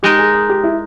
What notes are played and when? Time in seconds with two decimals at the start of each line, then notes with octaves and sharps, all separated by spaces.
0.03 G#3 D#4 G4 A#4 D#5
0.18 G#4
0.34 G#4
0.49 G4
0.64 E4